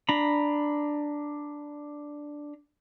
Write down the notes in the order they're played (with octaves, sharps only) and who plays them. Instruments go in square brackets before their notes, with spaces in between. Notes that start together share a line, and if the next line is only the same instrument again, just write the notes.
[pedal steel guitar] D4 A#5 B5